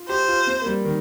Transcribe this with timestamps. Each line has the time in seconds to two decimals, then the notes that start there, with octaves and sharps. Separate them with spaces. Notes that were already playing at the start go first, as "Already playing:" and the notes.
Already playing: F4
0.09 G4 C5
0.28 F4
0.47 C4
0.61 A#3
0.66 G3
0.85 D#3